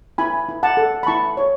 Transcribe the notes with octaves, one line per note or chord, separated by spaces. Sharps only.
E4 G#5 B5
E4
F#5 A5
A4
B5
E4 A5 C#6
C#5